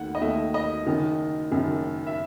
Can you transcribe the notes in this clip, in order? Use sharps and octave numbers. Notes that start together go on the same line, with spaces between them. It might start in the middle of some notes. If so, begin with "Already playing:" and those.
Already playing: D#2 D#3 A3 F#5
D#5
D#2 D#3 A3 E5
D#5
F#1 F#2 D#3
F#1 F#2 D#3
E5